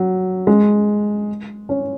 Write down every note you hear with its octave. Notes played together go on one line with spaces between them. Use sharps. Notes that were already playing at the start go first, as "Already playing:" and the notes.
Already playing: F#3
G#3
C#4